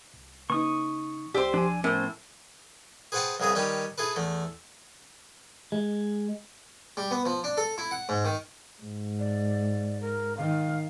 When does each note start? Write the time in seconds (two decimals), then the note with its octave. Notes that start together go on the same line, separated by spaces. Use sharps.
0.14 C2
0.50 C#3 A#3 D#4 B4 C#6 D#6
1.34 C2 G4 C5 D5 E6
1.54 F3 D4 G#5
1.84 A2 B3 C#4 A#4 C5
3.12 G#4 B4 C5 F#5 G5 A5
3.40 C2 C#3 B3 G#4 D#6
3.55 D#3 G3 C#4 B4 G5 B5
3.98 E4 G#4 A4 B4
4.16 E2 A3
5.72 G#3
6.97 G3
7.11 B3
7.25 F3
7.44 D4
7.57 A4
7.78 E4
7.91 F#5
8.09 G#2
8.25 D#3
8.82 G#2
9.19 D5
10.01 A#4
10.37 D#3 F5